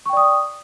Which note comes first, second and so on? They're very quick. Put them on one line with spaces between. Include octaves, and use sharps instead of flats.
C#6 G5 D5 D#6